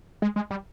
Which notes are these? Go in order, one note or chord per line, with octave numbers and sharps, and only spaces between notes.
G#3
G#3
G3